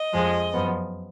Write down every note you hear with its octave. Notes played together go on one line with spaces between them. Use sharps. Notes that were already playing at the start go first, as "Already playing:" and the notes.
Already playing: D#5
F2 F3 G#3
F#2 F3 B3